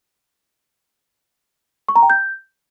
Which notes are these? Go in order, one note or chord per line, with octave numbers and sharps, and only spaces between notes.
C#6
A#5
G5
G6